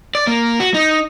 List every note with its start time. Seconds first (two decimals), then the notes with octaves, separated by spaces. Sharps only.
0.15 D5
0.27 A#3
0.60 F#4
0.74 D#4